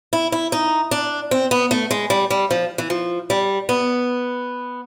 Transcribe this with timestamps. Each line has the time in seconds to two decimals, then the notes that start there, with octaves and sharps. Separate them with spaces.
0.13 E4
0.32 E4
0.52 D#4
0.91 D4
1.31 C4
1.51 B3
1.71 A3
1.91 G#3
2.10 G3
2.30 G3
2.51 F3
2.78 E3
2.90 F3
3.30 G3
3.69 B3